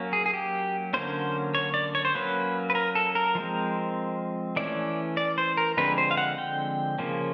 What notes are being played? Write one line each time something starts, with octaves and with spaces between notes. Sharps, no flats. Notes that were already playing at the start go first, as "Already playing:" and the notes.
Already playing: F#3 A#3 C#4
G#4
G#4
G4
D3 F#3 A#3 C#4 C5
C#5
D5
C#5
C5
F#3 A#3 C#4 B4
B4
A#4
A4
A#4
F3 G#3 C4
E3 A3 C#4 D5
D5
C5
A#4
D3 F3 G#3 C4 B4
C5
F5
F#5
G5
C#3 F3 A#3 C#4